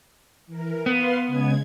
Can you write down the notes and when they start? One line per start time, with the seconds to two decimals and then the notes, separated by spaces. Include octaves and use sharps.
0.47 E3 A#4
0.86 B3 B4 F5 C6
1.27 C#3 G#3 G#6